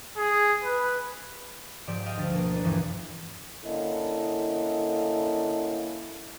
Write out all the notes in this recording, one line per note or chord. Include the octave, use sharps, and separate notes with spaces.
G#4
B4
G#2 F3 G4 D5 E7
D#5 F5 G5
D2 G3 A6
B2 A#3
B3 D4
E2 G2 E3 F3
D3 A#3 C#4 E4 A4 D#5